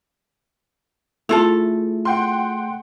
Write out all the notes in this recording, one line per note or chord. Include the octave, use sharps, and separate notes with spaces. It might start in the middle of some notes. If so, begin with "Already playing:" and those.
A3 E4 F4 G#4 A4
F#5 G5 C6